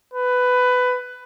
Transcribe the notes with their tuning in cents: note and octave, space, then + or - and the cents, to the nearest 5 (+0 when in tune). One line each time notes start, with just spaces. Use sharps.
B4 +15